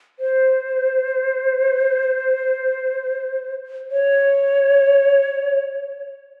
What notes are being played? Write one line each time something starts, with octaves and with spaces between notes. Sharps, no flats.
C5
C#5